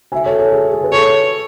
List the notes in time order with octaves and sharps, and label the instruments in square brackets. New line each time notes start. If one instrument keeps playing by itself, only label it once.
[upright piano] E5 G#5
A4 C#5
A4
G#4
G#4
B4
[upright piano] A4 [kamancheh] C#5